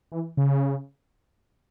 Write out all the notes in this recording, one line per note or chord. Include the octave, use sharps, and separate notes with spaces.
E3
C#3